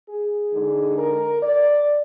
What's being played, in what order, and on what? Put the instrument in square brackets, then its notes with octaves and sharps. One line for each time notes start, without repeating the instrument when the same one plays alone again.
[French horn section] G#4
D3 G#3 D#4
A#4
D5